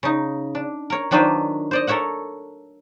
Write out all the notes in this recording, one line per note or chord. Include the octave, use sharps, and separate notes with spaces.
C#3 D#4
D4
A#4 C#5
D#3 F#3 D4 F4 B4 C5
C5 D5 D#5
A4 A#4 C#5 E5 F#5